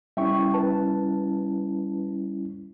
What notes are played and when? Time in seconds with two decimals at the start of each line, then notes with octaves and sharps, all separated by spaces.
0.17 G3 C#4 E4 E5 G5 C#6
0.54 B4 A5